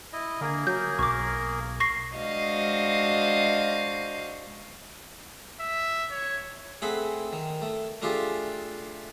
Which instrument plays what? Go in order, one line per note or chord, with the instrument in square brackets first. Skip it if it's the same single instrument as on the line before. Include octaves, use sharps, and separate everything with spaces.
[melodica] E4 D#5
[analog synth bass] D3 [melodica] A#3 G#4 A#4
[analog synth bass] F#3 [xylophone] G6
[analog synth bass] B1 [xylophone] C#6 D6
[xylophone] C#6 A#6 C7
[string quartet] G#3 D4 F#4 C5 D#5 F5
[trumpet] E5
C#5
[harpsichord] A3 C4 G#4 F#5 B5
D#3
A3
A3 D4 F4 G4 G#4